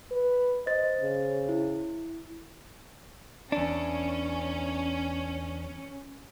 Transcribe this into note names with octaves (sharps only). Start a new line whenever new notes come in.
B4
C5 D#5 A6
C#3
E4
E2 C#4 D4